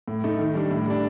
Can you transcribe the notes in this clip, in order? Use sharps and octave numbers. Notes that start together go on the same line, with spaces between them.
A2
A3 D#4
D#3
G3 D4
A2
G3 D4